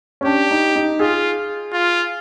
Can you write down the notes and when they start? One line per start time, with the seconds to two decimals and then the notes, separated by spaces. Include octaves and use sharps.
0.21 C#4
0.25 D4 G4
0.51 D#4
0.76 D#4
1.00 F4 G#4
1.73 F4